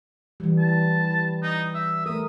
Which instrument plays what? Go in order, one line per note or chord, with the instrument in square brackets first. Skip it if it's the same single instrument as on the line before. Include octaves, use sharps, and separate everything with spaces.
[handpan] E3 G3
[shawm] A5
D#4
E5
[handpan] A3 A#4 [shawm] D#6